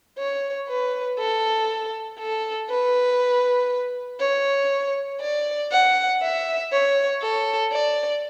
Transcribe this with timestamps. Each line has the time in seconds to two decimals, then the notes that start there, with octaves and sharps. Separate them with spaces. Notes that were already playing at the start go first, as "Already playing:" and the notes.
0.18 C#5
0.68 B4
1.19 A4
2.19 A4
2.70 B4
4.20 C#5
5.21 D5
5.72 F#5
6.22 E5
6.72 C#5
7.22 A4
7.72 D5